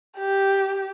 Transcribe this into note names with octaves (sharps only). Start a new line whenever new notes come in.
G4